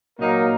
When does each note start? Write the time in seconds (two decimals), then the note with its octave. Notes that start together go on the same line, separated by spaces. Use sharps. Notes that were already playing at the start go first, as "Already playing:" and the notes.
0.19 A#2 F#3 A#3 D#4 A#4
0.40 A#2